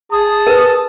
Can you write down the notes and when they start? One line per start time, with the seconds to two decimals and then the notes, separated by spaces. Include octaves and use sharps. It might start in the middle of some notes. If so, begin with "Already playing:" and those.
0.12 G#4 A5 D#6
0.47 A#4 B4